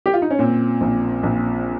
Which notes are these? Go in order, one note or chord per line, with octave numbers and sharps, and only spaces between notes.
G4
F4
D#4
C#4
A#2 C4
A#1
A#1